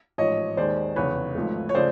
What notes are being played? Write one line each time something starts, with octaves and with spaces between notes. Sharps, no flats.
A1 G#2 F3 C#5 D#5
D#2 D#3 G#3 C5 D5
F1 E2 C#3 B4 C#5
G#1 G#2 F3 A3
C#5
C#3 F3 A3 C5 D5